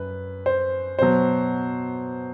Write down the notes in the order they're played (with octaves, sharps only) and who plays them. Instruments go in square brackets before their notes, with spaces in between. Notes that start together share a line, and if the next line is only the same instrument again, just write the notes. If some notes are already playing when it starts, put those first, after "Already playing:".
Already playing: [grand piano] F#2 B4
C5
B2 F#3 C5